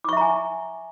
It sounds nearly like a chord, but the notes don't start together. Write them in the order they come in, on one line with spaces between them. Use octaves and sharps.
D6 C#6 E5 A#5 G#5